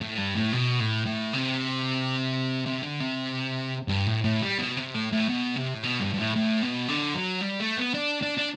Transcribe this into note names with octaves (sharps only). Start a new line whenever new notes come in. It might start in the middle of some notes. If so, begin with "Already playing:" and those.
A2
G2
A2
B2
A2
A2
C3
C3
D3
C3
G2
A2
A2
G3
B2
C3
A2
A2
B2
C3
A2
B2
G2
G2
A2
A2
B2
D3
F#3
G3
A3
B3
D4
D4
D4